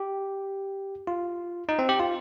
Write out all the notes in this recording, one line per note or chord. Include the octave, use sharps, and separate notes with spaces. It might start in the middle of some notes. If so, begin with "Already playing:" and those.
Already playing: G4
F4
D#4
C4
G4
F4